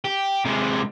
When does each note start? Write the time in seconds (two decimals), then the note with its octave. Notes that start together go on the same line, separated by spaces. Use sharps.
0.05 G4
0.45 C3 G#3